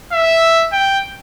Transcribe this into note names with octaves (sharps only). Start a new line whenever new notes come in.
E5
G5